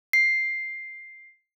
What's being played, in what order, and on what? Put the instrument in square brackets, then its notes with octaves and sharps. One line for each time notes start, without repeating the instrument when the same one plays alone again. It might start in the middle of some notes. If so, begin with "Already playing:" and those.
[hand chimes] C7